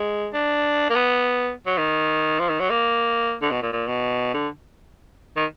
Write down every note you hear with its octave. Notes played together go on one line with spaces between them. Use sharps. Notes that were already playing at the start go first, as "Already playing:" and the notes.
Already playing: G#3
D4
A#3
B3
F#3
D#3
F3
D#3
F#3
A#3
D3
B2
A#2
A#2
B2
D3
D#3